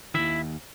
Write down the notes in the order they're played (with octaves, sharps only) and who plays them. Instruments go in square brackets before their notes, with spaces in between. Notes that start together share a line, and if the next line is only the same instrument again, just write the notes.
[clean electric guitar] D#2 D#3 E4 E5